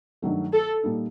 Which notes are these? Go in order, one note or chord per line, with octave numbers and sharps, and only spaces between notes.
G2 D#3 F#3 A3
A4
A#2 G3 A#3 D#4